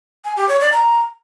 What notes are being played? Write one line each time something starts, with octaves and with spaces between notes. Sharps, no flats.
G#5
G4
C#5
D5
A#5